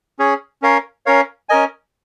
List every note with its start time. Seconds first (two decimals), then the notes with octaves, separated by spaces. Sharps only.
0.19 C#4 G#4 C#5
0.62 C#4 A#4 C#5 F5
1.06 C#4 A#4 C#5 F5
1.49 C#4 A#4 D#5 G#5